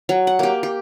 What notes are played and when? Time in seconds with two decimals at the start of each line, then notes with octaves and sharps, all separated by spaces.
0.09 F#3
0.27 F#5
0.39 A#3 G4
0.63 G4